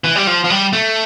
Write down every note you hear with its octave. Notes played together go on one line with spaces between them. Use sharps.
E3
G3
F3
F3
G3
A3